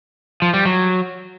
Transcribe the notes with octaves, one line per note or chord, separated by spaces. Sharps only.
F3
G3
F#3